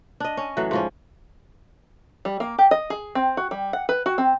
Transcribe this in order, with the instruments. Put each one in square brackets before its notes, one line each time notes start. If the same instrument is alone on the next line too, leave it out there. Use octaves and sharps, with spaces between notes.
[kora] D4 D#5
C#4
A2 E3 F#3
G#2 F3 C#4
[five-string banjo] G3
A#3
G4
D#5
G#4
C4
F#4
G3
F#5
B4
F#4
C4